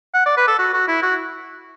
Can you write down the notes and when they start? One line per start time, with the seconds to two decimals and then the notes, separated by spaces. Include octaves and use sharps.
0.14 F#5
0.26 D5
0.37 B4
0.48 A4
0.59 F#4
0.74 F#4
0.88 E4
1.03 F#4